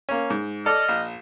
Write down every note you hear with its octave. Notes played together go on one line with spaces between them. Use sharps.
A#3 C#4
G#2
A4 D5 D#5 F6
A#1